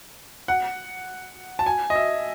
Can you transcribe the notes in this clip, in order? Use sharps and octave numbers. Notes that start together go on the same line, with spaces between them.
F#5
A5
G#5
D#5
E5